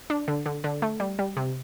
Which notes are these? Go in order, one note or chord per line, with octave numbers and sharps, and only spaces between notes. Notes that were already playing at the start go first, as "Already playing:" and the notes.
D4
D3
D3
D3
A3
G3
G3
C3